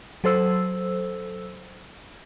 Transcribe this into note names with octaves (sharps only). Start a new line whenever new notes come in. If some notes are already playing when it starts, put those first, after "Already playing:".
F#3 A4 C5 E6